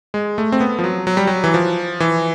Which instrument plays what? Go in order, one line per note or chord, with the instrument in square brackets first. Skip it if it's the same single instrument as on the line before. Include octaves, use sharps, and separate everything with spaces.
[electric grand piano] G#3
A3
C4
B3
F3
F#3
F#3
G3
F#3
E3
F3
E3